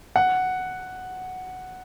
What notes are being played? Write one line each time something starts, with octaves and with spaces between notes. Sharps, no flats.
F#5